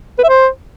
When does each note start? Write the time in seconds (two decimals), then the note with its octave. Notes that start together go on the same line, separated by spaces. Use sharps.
0.18 B4
0.23 E5
0.29 C5